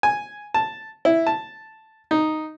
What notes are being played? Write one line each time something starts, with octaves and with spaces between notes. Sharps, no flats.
G#5
A5
E4
A5
D#4